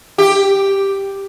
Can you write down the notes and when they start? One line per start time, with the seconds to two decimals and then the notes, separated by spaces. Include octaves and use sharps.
0.18 G4